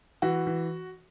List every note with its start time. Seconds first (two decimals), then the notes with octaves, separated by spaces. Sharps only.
0.22 E3 F#4
0.47 E3